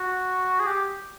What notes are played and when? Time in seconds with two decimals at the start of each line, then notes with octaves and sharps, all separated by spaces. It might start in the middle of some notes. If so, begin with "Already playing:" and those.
Already playing: F#4
0.60 G#4
0.66 G4